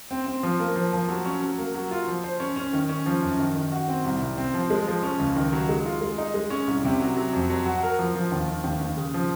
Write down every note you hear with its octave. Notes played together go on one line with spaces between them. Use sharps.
C4
C4
F3
A#3
F3
F3
F#3
C#4
F#3
A#3
F#3
F4
F3
C5
C#4
C#4
D#3
C#4
F3
F#2
D#3
D#3
F#4
C4
C2
C2
C4
F3
G#3
F3
C#4
C#2
D#3
F#3
G#3
F4
G#3
D#4
G#3
C#4
C2
C3
F#3
F#3
F2
F#3
F#4
A#4
F3
F3
D#2
D#3
D#2
D#2
C#3
F3